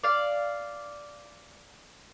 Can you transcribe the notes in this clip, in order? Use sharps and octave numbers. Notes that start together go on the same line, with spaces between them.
D5 F5